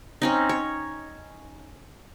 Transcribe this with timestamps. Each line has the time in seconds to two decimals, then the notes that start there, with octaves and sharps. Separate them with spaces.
0.22 C4 C#4 D#4
0.49 C#5